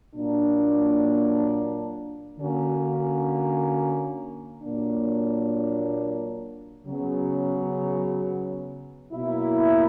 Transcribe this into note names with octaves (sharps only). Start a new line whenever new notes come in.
A#2 F#3 A#3 D4
D3 A#3 C#4 F#4
A#2 F#3 A#3 D4
C#3 F#3 B3
B2 F#3 A#3 E4